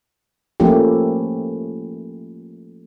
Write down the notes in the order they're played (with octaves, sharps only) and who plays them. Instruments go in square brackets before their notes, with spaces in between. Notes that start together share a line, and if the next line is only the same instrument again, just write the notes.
[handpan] F3 A3 A#3 C#4 E4 G4